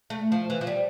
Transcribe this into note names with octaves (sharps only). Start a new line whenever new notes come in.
A3
F3
E3
F3
G3